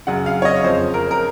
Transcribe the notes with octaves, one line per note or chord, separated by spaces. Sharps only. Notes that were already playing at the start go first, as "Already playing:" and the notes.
F#2 C#3 F#5
F5
C#5
D#5
F2 C#3 C5
A#4
A#4